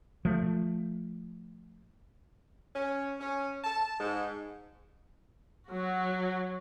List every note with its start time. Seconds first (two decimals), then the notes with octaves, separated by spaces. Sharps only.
0.25 F3 A3
2.75 C#4
3.20 C#4
3.64 A5
3.99 G#2
5.69 F#3 F#4